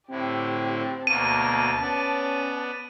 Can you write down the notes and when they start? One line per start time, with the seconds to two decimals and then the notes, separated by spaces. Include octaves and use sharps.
0.10 A2 D3 C4 E4 G4
1.07 D2 B2 A#3 A5 D#7
1.81 B3 C#4 D5